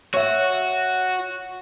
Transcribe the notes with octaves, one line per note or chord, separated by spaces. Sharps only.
F#4 C#5 E5